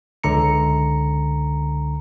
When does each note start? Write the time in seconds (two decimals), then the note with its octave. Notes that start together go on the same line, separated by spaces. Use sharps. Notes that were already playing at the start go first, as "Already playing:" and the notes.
0.24 C#2 D3 A#5 C#7